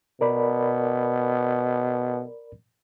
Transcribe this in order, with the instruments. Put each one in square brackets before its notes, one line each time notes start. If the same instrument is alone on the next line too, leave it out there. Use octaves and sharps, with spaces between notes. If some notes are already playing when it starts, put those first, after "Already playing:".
[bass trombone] B2 [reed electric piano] A#4 D5 B5